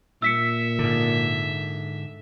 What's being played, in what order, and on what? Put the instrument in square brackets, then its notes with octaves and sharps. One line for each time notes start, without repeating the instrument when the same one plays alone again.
[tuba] A#2 [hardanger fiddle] E5 [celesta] E6 B6 C#7
[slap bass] G#2 D3